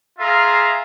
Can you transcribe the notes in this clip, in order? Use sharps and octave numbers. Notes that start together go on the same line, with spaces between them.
F4 G#4 E5 F5 A#5